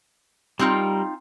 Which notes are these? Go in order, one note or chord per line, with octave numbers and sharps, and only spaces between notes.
G3 C4 D#4 F4 A#4